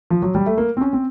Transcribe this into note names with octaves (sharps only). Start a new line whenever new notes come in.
F3
F#3
G3
A3
A#3
C4
C#4
C4